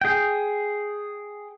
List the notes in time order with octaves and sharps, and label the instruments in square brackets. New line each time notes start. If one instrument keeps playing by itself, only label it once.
[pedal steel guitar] G#4 G5